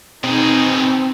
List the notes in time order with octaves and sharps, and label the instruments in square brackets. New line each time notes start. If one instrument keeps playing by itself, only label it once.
[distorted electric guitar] B2 G#4 [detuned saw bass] C4 [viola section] D#4